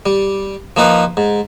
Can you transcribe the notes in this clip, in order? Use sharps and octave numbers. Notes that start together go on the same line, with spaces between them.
G3
F3 A#3 D#4 B4
G#2